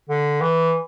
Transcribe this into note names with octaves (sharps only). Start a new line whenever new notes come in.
D3
E3